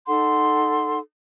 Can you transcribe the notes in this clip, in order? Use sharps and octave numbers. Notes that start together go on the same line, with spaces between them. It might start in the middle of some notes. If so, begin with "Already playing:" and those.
D#4 A4 F#5 C6